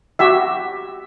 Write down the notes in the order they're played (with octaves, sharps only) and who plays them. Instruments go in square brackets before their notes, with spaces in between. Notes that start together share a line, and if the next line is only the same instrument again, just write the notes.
[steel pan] F#4 G4 E5